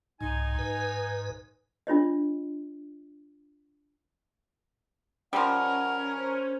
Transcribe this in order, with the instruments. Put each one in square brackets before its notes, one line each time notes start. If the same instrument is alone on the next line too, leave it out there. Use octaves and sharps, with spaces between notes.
[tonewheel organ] C2 G#2 [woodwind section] D#4 G#5
[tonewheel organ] G#2 B4
[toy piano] D4 F4 C#5 D#5
[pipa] F3 G3 [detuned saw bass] C#4 [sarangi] A#4 [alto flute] F#5
[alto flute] C5